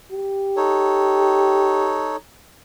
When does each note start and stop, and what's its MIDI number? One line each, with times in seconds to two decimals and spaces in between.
0.11 2.16 67
0.57 2.17 63
0.57 2.17 69
0.57 2.17 73